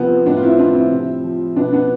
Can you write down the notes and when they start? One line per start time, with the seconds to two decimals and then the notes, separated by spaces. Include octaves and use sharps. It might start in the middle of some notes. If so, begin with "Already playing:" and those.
Already playing: C3 F3 B3 C4
0.26 A2 B3 D4
0.37 F4
0.42 C4 E4
0.58 F3 D4 F4
0.75 C4 E4
0.92 C3
1.24 F3
1.56 B2 B3 D4
1.73 B3 D4